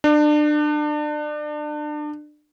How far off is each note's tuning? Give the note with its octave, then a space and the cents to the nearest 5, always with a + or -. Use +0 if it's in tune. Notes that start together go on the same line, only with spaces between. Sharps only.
D4 +30